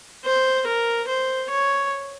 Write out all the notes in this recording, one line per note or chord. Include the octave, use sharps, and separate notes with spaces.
C5
A#4
C5
C#5